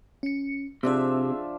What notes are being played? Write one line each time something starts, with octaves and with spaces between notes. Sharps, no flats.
C#4 C#7
C3 F3 D4 G#4 E5 E6